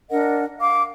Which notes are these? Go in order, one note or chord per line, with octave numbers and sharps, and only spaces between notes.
D4 A#4 D#5 F#5
F5 D6